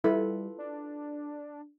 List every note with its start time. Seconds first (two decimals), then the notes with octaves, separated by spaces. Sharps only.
0.04 G3 E4 F4 A4 B4
0.58 D4